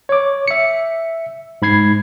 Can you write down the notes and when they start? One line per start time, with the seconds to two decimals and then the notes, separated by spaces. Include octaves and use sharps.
0.09 C#5 D6
0.48 E5 C#7
1.62 G#2 B5 G#6 C7